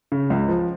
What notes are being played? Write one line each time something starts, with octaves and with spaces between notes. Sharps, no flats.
C#3
C#2
F3